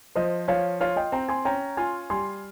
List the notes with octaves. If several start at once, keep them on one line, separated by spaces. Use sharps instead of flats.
F3 C5 D#5
F3 C#5 F5
F4 C#5 F5
D#5 G5
C4 G5 A#5
G#5 C6
C#4 G5 A#5
F4 G#5 C6
G3 G#5 C6